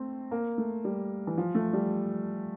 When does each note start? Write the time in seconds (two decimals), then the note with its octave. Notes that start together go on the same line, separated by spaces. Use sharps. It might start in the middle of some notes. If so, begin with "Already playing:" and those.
Already playing: A3 C4
0.31 A#3
0.58 A3
0.84 G3
1.27 E3
1.38 F3
1.55 A3
1.73 G3